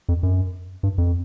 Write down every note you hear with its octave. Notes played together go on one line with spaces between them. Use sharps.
F2
F#2
G2
F2